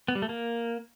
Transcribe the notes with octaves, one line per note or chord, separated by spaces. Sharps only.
B3
G3
A3
A#3